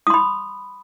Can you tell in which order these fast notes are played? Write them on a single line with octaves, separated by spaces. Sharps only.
D#6 C6 B5